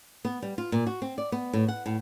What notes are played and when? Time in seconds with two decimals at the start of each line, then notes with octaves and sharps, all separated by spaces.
0.25 B3
0.42 G3
0.58 F4
0.72 A#2
0.87 F#4
1.02 C4
1.18 D5
1.32 B3
1.53 A2
1.68 F#5
1.86 A2